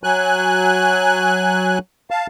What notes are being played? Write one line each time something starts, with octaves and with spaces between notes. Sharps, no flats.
F#3 G#5 F#6
F5 A5